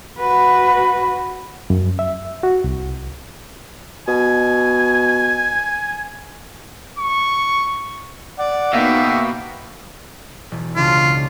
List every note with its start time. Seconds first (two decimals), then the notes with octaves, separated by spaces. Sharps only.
0.20 F#4 B4
1.70 F#2
1.99 E5
2.43 F#4
2.64 C2
4.08 B2 G#5
6.99 C#6
8.39 D5 F#5
8.73 B2 A#3 B3 D#4 E5 G5
10.51 E1
10.76 C#2 C#3 D4 F4